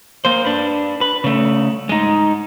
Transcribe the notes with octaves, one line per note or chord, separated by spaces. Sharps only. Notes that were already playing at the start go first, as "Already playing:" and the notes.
A#3 C5
D4 B4
B4
C#3 A3
G#3 D#4